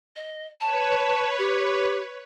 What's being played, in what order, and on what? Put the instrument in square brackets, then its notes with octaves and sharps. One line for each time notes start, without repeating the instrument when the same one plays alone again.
[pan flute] D#5
[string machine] B4 C#5 [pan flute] A5
[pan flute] G4